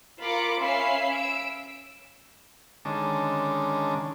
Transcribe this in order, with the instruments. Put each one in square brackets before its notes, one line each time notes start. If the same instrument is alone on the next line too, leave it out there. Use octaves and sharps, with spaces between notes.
[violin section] F4 A#4 B5 D6 C#7
C#4 E5 F5 B5 C7
E6 D7
[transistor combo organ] D3 D#3 G#3 C#4 A5 D6